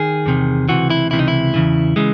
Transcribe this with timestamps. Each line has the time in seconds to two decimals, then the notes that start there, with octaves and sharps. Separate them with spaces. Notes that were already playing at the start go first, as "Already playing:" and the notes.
Already playing: D#3 G#4
0.26 E2 C3 D#3
0.69 C#2 C3 E3 F#4
0.90 E4
1.11 C#2 C3 E3 E4
1.19 D#4
1.28 E4
1.54 E2 C#3 E3
1.96 C#3 E3 G#3